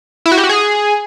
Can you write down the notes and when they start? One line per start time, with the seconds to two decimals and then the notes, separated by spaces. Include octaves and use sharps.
0.26 E4
0.32 F#4
0.38 G4
0.43 F#4
0.49 G#4